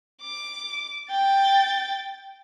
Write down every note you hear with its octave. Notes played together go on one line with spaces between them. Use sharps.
D6
G5 A6